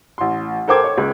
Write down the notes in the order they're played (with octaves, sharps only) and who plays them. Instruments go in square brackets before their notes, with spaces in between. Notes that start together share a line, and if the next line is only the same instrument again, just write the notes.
[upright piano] A1 C6
A4 A#4 C5 G5 D6 G#6
C#5
C#2